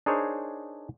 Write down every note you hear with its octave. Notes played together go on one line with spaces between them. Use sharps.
D4 D#4 G#4 A#4 C5 C#5